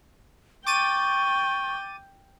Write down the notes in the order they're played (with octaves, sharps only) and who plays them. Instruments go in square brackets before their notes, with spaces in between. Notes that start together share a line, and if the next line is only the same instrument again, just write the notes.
[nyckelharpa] G5 [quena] C#6 [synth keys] D6 A6 D#7